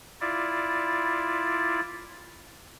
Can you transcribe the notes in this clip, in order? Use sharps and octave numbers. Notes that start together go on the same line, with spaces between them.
E4 F4 D5